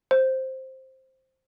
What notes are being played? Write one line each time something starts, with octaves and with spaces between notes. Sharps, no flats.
C5